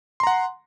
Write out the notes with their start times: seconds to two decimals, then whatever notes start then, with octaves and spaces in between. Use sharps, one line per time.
0.20 C6
0.23 A#5
0.27 F#5